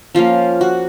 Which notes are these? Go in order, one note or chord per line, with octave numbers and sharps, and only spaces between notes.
F3 A#3 C#4 F4
F#4